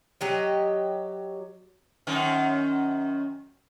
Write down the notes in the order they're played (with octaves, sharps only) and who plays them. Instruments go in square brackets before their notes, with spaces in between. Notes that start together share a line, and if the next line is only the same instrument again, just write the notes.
[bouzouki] F#3 G4 D#5
[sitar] F#2 D#3 C#4